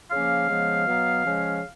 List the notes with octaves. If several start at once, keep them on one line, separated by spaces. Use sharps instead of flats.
C#3 F3 A#3 C#4 F5
C#3 F3 G#3 B3
B2 F#3 B3
C#3 F3 G#3 C#4